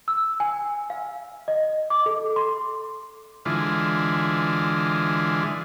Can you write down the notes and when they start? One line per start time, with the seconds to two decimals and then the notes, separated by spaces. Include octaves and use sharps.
0.08 E6
0.40 G#5
0.90 F5
1.48 D#5
1.90 D6
2.06 A4
2.36 C6
3.45 D3 E3 G#3 F4